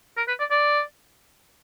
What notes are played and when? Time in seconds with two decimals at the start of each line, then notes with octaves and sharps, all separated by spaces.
0.17 A#4
0.28 B4
0.39 D5
0.51 D5